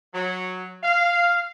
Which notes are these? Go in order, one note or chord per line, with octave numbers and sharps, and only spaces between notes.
F#3
F5